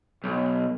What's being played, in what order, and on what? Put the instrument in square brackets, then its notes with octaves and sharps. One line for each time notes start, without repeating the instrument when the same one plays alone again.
[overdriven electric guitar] B1